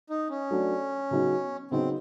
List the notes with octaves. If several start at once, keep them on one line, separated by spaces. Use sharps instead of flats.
D#4
C#4
F#3 A3 D4 F#4
C#3 F#3 B3 D#4 F#4
C#3 F#3 B3 C4 D#4 F#4